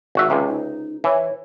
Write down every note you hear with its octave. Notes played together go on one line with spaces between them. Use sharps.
G#1 F#4 E5
C#2 C3
D#4
E3 C#5